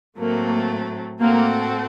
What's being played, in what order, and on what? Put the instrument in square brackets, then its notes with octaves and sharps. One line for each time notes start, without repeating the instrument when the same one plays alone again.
[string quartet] A2 F#3 A3 C4 [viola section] A#3
[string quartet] A2 A3 C4 F#4 A4 [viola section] A#3